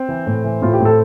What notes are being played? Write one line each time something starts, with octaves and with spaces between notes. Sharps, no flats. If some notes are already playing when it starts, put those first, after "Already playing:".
Already playing: C4
E3
A2
E3
A2 F4
G4
A2
A4